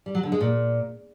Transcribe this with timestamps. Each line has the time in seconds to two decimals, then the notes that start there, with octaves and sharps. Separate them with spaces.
0.06 G3
0.15 F#3
0.23 D3
0.32 G#3
0.41 A#2